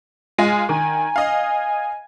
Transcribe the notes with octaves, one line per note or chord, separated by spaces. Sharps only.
G#3 F4 G#5
D#3 G#5
D#5 F5